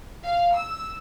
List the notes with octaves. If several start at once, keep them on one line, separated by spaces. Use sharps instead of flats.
F5
E6